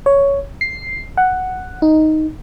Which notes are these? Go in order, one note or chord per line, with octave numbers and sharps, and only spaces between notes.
C#5
C7
F#5
D#4